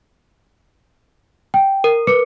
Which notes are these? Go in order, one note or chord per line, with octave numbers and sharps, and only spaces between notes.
G5
A#4
B4 D6 C#7